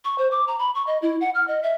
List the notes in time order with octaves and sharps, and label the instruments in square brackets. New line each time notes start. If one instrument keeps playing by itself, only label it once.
[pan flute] C#6
C5
D6
A#5
B5
C#6
D#5
E4
F#5
F6
D#5
E5